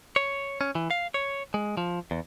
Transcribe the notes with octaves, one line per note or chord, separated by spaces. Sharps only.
C#5
C#4
E3
F5
C#5
G#3
F3
E2